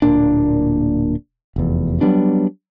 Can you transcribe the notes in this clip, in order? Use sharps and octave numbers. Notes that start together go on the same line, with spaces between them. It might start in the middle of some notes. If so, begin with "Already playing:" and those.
D1 A#2 A#3 D4
F1 E2
F#3 G3 B3 D4